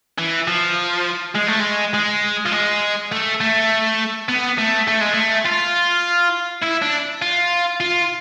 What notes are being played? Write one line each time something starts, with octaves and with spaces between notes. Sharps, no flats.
E3
F3
G#3
A3
G#3
G#3
F3
G#3
A3
A3
B3
A3
A3
G#3
A3
F4
E4
D4
F4
F4